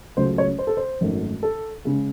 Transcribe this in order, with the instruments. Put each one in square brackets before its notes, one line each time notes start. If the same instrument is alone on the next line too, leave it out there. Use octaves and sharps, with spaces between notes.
[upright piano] C#2 C#3 F#3 A3 C5
C#5
C5
A4
C5
G#1 F#2 D#3 A3
A4
C#3 G#3